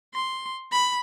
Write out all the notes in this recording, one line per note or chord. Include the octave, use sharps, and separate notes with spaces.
C6
B5